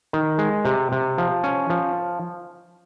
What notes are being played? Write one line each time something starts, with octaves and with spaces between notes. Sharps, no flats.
D#3
G#3
C3
C3
F3
C#4
F3